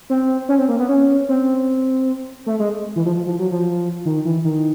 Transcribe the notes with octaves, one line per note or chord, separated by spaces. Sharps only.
C4
C#4
C4
A#3
B3
C#4
C4
A3
G#3
E3
F3
F3
F3
F#3
F3
D#3
E3
D#3